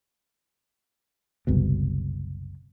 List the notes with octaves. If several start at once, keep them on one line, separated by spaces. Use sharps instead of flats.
F#1 C2 B2